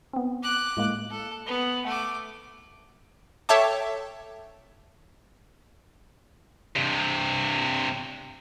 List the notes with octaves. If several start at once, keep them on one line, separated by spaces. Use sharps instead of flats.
B3 C4
D6 F#6
A2 G#3 A#3
A4
B3
A3 F#5 D6
A4 C#5 E5 G5 A5 D6
G2 C3